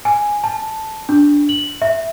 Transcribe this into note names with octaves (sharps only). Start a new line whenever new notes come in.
G#5
A5
D4
F#7
E5